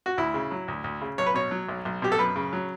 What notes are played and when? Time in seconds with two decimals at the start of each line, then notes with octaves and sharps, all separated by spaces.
0.06 F#4
0.18 D2 E4
0.34 C#3
0.51 F#3
0.68 D2
0.84 D2
1.01 C#3
1.18 B1 C#5
1.26 B4
1.34 B2 C#5
1.51 F#3
1.69 B1
1.85 B1
2.02 B2 G4
2.12 A4
2.19 F#2 B4
2.36 C#3
2.53 F#3